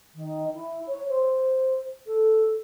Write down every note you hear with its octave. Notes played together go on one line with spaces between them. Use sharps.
D#3
E4
C#5
C5
A4